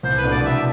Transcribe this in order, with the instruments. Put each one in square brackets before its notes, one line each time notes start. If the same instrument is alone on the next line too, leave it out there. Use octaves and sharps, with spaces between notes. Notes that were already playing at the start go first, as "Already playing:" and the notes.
[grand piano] C2 [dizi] C5
[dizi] B4
[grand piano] B2 A3 D4
[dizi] D5
[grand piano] C2 [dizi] E5